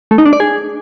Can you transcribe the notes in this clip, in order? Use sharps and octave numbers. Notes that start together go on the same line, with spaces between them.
A3
D#4
D4
D5
G#4